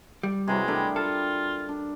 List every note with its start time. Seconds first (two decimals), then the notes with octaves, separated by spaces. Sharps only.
0.23 G3
0.48 C3 E3 F#3 G#3
0.68 G3 A3 D4 A#4
0.96 F4 A4
1.69 D4